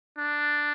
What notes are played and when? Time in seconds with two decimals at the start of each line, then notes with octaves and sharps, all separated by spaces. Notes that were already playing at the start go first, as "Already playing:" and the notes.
0.18 D4